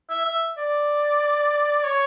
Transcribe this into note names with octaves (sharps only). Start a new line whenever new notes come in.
E5
E5
D5
C#5